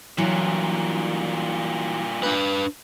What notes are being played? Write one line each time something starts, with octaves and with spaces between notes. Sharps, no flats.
G2 A#2 E3 F#3
D4 B4